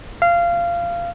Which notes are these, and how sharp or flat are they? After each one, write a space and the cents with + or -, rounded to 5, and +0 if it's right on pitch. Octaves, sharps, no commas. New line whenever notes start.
F5 -20